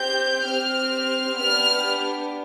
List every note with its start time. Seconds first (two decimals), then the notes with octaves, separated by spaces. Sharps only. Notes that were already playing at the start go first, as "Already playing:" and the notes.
Already playing: C4 G4 G6
0.44 C4 G4 F6
1.37 B3 D4 G4 F6